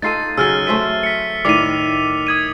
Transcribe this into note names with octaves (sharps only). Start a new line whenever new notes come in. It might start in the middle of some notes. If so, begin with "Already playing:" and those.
D#4 F4 A4 A6 C7 D#7
C#3 F#3 E6 F6 A6
A3 C5 E5 D#7
B6 C#7
A2 D#3 D5 D6 C7 D#7
D#6 G#6 D#7